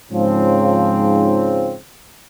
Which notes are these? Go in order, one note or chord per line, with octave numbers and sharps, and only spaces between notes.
G#2 C#3 F3 C4